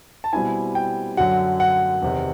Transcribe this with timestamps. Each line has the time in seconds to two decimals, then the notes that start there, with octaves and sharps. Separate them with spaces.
0.24 A5
0.33 B2 G3 C4 E4 G#5
0.75 G5
1.17 F#2 D3 F#3 F#5
1.60 F#5
2.02 E2 C3 D#3